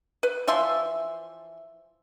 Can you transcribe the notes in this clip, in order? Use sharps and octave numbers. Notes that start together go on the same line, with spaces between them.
B4
E3 F3 E5 C6